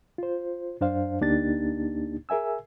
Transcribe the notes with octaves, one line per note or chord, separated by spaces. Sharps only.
F4 C5
F#2 D4 C5 F5
D2 A#3 D4 D#4 G4 A6
G#4 A#4 E5 G#5 E6